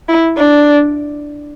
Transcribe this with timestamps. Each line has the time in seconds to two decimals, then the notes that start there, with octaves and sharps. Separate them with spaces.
0.08 E4
0.37 D4